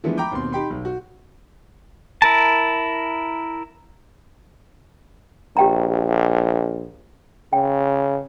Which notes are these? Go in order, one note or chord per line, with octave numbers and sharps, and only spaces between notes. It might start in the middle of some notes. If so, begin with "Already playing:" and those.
D3 E3 F3 G#3 A3 B3
G5 A#5 B5 D6 G6
D#2 B2 C4 C6
D#4 G4 G5 B5 C6
B1
F#4
E4 A#4 A5
A#1 G4 G5 A#5
C#3 G5